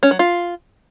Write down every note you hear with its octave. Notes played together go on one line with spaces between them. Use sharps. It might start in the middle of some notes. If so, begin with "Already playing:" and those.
C#4
F#3
F4